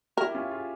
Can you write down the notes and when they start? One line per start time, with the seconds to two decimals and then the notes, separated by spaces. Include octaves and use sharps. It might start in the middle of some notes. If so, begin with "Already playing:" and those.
0.17 E4 A#4
0.29 G4
0.34 C#4 F4
0.51 F4 G#4